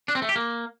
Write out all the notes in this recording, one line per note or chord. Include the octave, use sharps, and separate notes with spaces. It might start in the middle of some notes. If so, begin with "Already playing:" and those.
D4
C4
A3
G4
A#3